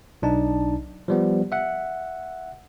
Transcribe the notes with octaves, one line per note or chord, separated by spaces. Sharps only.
B1 D4 D#4 A5
F3 G3 B3
E5 F#5